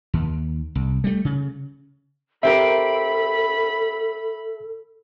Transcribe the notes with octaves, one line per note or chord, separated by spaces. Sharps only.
D#2
C2
G3 A3
C#3
C4 G4 A4 A#4 E5 B5